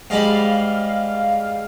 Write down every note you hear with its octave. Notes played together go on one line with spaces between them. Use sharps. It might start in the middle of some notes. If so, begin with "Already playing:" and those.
G#2 G3 F5 B5